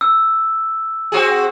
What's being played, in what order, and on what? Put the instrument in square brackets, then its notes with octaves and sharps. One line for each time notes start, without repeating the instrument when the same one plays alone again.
[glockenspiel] E6
[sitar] C4 F#4 G#4